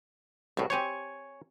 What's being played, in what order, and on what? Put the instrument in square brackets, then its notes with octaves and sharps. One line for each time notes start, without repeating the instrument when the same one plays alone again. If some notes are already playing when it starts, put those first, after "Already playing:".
[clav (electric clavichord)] C2 A2 [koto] F#4 E5
[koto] C4 G4 C5 [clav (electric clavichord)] C#5 G#5